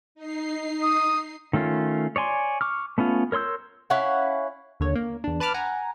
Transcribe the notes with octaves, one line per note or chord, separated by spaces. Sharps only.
D#4 C7
D#6
D#3 A3 C#4 F4
C#5 D5 G#5 C6
C#6 D6 F6
A3 B3 C#4 F4
A#4 C#5 C6 E6 G6
C#4 E4 F5 F#5
D#2 D3 C#5
A#3
E2 D4
B4 A5 B5 D6 F6
F#5 G#5 A#5